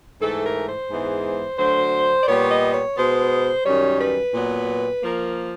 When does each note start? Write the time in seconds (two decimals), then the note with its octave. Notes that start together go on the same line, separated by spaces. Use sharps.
0.21 G#2 E3 A3 A4
0.44 A#4
0.67 C5
0.90 G#2 E3 G#3 B3
1.58 D2 D3 F#3 C5
2.23 D5
2.27 A#2 G3 B3 C#5
2.50 D#5
2.73 C#5
2.96 B2 G#3 B3 C5
3.65 F#2 D#3 G3 C#5
3.99 B4
4.34 A#2 F#3 B3
5.03 F3 A#3 A#4